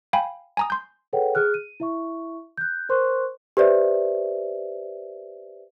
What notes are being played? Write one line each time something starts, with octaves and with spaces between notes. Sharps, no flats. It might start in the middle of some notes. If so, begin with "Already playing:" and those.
F5 G5 G#5 B5
G#5 A#5 D#6
C6 G6
G#4 A4 B4 C#5 F#5 G5
G#4 F6 F#6
D#7
E4 E5 C#6
F#6 G6
A#4 C5 C6 C#6 F#6
G4 B4 C5 D5 E5